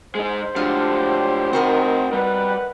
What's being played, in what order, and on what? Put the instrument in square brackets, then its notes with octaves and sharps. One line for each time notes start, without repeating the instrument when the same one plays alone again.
[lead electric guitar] G#3 D#4 [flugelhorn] C5
[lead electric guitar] A2 D3 [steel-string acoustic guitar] F3 G#3 F4 [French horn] G4
[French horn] D#3 [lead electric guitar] C4 F#5 [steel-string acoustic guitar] F#4 A#4 D#5
[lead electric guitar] G3 [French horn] B4 [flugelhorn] F#5